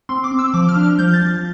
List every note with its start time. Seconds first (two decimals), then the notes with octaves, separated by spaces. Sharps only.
0.09 C4 C6
0.24 D6
0.31 C4
0.39 E6
0.54 F3 D6
0.69 F6
0.76 D4
0.83 F6
0.99 F3 G6
1.14 A6
1.22 F3